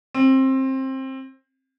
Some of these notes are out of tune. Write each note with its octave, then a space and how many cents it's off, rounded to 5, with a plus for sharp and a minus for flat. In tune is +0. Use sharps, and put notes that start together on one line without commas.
C4 +20